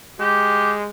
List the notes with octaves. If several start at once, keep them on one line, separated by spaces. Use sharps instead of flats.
G#3 G4